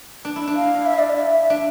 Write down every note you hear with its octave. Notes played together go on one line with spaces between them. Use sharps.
D4
E4
D4
F5
E5
D5
E5
D4